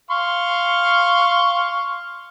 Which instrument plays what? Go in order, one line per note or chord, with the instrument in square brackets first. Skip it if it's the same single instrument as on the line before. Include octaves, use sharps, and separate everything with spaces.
[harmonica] F5 C6 C#6